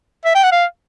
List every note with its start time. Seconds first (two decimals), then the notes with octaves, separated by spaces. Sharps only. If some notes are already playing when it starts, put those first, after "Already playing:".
0.25 E5
0.34 G5
0.43 F#5
0.52 F5